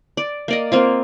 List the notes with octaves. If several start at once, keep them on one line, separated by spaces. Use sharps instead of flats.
D5
A#3 D5 D#5
A#3 C4 F4